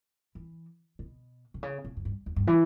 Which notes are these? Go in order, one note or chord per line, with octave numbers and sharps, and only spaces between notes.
E3
B2
B2
C#3
B2
F#2
G2
E2
G2
E3